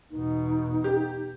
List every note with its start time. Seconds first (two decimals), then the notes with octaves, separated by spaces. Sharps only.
0.11 E2 B2 D#4
0.84 G4